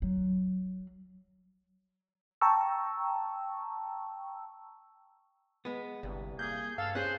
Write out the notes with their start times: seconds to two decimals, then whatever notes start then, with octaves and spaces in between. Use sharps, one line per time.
0.02 F#3
2.41 G5 A5 A#5 C#6 E6
5.65 G#3 B3
6.03 G1 C2
6.39 A#3 G#4 G6
6.78 G2 A4 F5
6.95 C#4 G#4 C5 F#6